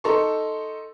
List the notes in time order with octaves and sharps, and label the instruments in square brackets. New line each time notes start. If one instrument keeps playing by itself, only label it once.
[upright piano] D#4 A4 A5 A#5 C6 C#6